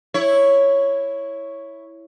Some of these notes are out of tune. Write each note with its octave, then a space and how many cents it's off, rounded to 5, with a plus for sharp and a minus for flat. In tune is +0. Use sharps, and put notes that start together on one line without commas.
E4 +0 C#5 +0